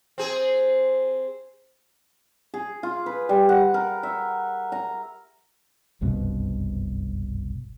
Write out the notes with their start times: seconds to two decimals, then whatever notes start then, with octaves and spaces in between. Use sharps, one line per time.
0.18 C4 G#4
2.54 G#4
2.83 F4
3.06 B4
3.29 G3
3.49 F#5
3.74 A#4
4.03 E5
4.72 A#5
6.01 F#1 C2 G2 B2